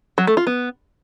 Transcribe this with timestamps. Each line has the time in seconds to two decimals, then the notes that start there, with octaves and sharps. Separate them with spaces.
0.18 F#3
0.27 A3
0.37 F4
0.47 B3